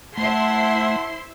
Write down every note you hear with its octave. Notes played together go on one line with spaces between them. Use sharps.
A3 E4 C5 E5 F#5 A5 C6